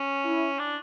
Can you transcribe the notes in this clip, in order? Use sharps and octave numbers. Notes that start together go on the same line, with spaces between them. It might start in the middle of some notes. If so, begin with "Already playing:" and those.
Already playing: C#4
E4
D4